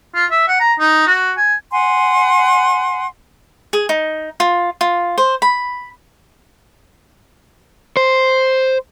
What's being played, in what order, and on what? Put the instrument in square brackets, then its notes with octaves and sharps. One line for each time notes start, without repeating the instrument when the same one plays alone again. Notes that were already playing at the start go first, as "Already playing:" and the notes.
[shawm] F4
E5
F#5
A#5
D#4
F#4
G#5
[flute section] F#5 G#5 C6
[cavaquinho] G#4
D#4
F4
F4
C5
B5
[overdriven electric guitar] C5